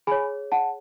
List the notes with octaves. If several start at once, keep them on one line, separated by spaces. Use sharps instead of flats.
G#4 C#5 G#5 B5
F#5 A5